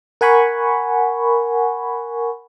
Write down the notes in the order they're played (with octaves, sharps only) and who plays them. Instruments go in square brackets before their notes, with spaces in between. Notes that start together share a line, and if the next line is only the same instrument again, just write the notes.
[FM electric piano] A#4 F#5 G#5 B5 C#6